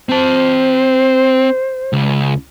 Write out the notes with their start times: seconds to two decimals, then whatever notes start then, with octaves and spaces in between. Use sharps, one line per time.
0.09 C4 C5 A5
1.93 C#2